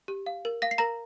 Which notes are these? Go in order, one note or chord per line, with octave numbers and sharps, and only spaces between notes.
G4
F5
A#4
F5 A#6
C7
A#4 A#5 A#6